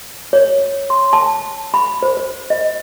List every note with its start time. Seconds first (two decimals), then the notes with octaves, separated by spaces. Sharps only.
0.33 C#5
0.90 C6
1.13 A5
1.74 B5
2.03 C5
2.17 C5
2.50 D#5